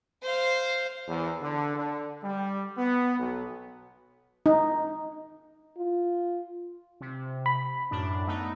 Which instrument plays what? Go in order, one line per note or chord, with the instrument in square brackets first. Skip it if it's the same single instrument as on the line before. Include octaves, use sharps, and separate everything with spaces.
[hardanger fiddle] C5 F5
[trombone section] E2
D3
D3
G3
B3
B1
[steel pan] D#4
[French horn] F4
[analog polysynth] C3
[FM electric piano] B5
[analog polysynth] F#2 A2 D4
A3 B3 D#4